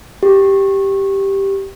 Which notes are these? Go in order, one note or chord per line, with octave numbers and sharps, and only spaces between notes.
G4